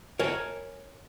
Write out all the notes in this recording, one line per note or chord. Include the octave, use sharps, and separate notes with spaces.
A#4 C#5 G#5 A5